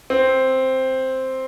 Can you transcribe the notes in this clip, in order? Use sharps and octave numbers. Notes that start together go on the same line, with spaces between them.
C4